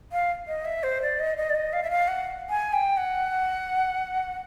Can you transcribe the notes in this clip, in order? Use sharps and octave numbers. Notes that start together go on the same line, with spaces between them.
F5
D#5
E5
C5
D5
D#5
D#5
D5
D#5
F5
E5
F5
F#5
G#5
G5
F#5